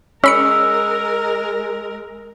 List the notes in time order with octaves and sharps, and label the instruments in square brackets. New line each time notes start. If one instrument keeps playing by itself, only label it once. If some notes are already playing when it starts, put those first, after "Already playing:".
[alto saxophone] G#3 [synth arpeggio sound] C#4 B5 C#7 [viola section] A#4 [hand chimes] E6